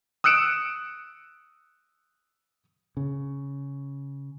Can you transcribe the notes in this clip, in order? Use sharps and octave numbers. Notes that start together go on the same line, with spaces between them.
D#6 E6 F#6 C#7 D7 E7
C#3